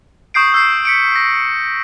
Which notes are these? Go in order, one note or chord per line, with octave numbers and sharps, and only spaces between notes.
C#6 D#6 G6 C7 D7
D#6 E6 G6 C7
B6 C#7 D7
A#6